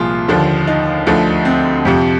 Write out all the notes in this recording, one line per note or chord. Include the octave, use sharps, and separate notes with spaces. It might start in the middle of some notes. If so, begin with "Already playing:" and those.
Already playing: C2 A#2 F3 F4 G#4
D#2 D3 F3
D#4
D2 D3 F3
C4
F2 C3 F3